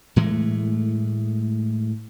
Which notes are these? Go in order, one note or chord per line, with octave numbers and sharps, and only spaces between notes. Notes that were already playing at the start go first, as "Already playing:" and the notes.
A2 E3 G#3 A3